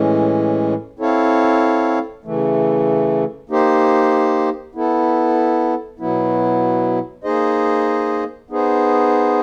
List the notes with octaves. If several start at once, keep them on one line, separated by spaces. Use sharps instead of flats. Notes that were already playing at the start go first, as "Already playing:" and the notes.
Already playing: A2 E3 G#3 C#4
C4 E4 A4 C#5 F5
C#3 E3 A3
A#3 D#4 G4 C5
B3 E4 A4
B2 F#3 B3 E4
A#3 D#4 G#4 C5 D#5
B3 D#4 G#4 C5